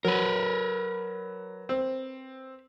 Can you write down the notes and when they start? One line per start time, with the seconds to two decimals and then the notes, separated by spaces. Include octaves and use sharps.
0.05 F#3 A#4 B4
1.69 C4